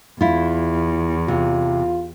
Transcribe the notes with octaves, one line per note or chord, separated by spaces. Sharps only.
E2 E4 F4
C3 F4